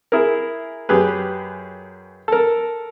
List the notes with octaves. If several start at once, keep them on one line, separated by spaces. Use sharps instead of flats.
E4 G#4 A#4
F#2 G4 G#4 B4
A4 A#4